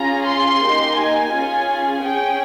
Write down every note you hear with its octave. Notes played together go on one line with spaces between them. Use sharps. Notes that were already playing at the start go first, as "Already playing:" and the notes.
Already playing: C#4 F4 G#4 A#5
C6
A#3 D#4 G4
G#5
C#4 F4 G#4
C#4 G#4 G5